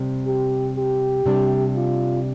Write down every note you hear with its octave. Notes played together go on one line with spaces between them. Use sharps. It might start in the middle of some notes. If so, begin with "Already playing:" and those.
Already playing: C3 G3
G4
G4
C3 G3 D4
F4